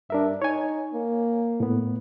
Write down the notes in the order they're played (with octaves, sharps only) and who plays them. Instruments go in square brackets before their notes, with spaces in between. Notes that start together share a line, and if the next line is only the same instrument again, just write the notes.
[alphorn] G2 [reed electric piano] D4 A#4 E5
[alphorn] D#4 [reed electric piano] C#5 G#5
[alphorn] A#3
[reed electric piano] A2 B3